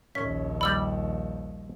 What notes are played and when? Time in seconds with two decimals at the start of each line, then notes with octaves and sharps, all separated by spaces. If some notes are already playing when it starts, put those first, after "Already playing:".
0.15 A#1 D#2 C#4 B6
0.61 G3 D5 B5 E6 F#7